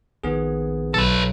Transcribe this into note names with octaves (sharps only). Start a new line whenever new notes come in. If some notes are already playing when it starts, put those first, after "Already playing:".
A#1 D#3 B3 G#4
B1 A4 B4